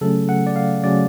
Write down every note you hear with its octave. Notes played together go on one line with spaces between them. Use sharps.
C#3 F#3 A3 C#4 A4
F#5
D5
F5
C#3 F#3 A3 C#4 D5